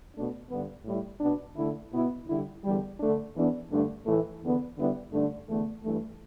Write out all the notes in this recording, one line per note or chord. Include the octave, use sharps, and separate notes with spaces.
B2 A3 D4
G2 D3 B3
A2 G3 E4
B2 B3 D4
D3 A3 E4
B2 B3 E4
D3 G3 E4
E2 D3 G3
D3 A3 D4
E2 E3 B3 D4
G2 D3 A3 D4
A2 E3 A3
E2 D3 B3
D3 G3 B3 E4
G2 D3 A3 D4
E2 D3 A3
G2 E3 A3